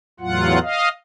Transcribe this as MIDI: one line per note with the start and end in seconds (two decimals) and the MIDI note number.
0.20 0.59 40
0.20 0.59 45
0.20 0.59 54
0.20 0.59 65
0.20 0.59 78
0.62 0.89 75
0.62 0.89 77